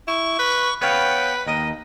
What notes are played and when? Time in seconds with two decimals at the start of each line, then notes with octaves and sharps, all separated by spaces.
0.08 E4 C#6
0.39 B4
0.81 B3 B4 C#5 F5 G5
1.46 D#2 A#4 D#5